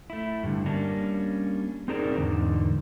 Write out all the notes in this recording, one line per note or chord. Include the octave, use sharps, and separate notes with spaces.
A3 E4
G2 D3
G3 A#3 C#4 D4
C4 D#4 G#4 A#4 C5 D5
E2 G#2 D3 D#3